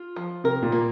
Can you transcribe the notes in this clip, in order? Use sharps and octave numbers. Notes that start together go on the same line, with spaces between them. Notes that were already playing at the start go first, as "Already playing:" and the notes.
Already playing: F4
F3
C3 A#4
A#2
A#3